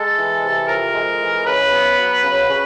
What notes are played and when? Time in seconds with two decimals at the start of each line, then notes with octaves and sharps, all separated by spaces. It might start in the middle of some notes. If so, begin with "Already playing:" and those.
Already playing: G#3 A4
0.16 E3
0.43 C3
0.68 F2 A#4
0.95 G#3
1.20 E3
1.46 C#3 B4
1.72 B3
1.98 F#3
2.23 C#3
2.49 C#3